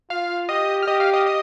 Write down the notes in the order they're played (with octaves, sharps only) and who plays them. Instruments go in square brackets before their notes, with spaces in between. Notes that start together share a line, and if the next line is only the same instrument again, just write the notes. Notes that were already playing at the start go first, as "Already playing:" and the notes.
[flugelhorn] F4 [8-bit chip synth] F5 F6
[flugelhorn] G4 [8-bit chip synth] D#5 D#6
[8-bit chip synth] F6
[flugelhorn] G4 [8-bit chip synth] D#5 D#6
[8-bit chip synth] F5 F6
D#5 D#6
D#5 D#6